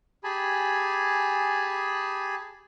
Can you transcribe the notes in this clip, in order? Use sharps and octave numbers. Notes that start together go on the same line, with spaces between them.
G4 G#4 G#5 A5 B5